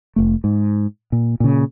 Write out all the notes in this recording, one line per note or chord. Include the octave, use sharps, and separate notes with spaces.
F1 A3
G#2
A#2
A#2 C#3